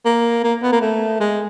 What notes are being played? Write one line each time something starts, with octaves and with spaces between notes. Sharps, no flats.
A#3
A#3
B3
A#3
A3
G#3